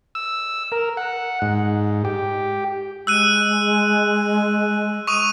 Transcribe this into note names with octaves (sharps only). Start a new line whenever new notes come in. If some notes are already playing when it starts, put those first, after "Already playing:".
E6
A#4
F#5
G#2
G4
G#3 E6 F#6 D#7
C#6 D#6 D#7